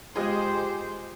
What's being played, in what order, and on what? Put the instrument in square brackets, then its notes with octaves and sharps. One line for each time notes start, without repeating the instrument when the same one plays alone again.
[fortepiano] G#3 F4 [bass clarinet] G4 [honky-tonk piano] G#4 D#5 D#6 [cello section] C5